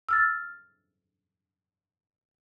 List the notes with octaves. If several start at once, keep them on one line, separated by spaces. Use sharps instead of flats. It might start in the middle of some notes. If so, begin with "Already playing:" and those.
E6 F6 A6